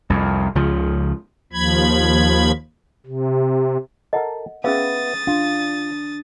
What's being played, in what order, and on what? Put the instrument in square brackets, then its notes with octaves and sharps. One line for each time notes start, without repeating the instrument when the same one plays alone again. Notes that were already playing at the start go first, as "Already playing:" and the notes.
[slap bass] C2 F2
C#2 C#3 F3
[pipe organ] D#2 F3 B5 G#6
C3
[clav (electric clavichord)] A4 A#4 [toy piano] D#5 F#5
[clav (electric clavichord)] B3 E5 [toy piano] C#4 G#4 F5 [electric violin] D#6 A6
[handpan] D4 [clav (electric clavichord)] F4